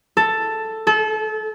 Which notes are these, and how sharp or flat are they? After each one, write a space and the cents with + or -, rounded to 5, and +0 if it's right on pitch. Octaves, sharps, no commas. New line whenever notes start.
A4 +5
A4 -30